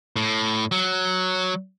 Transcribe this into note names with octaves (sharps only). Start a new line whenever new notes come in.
A2
F#3